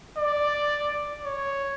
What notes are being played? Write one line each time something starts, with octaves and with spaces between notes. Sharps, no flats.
D5
C#5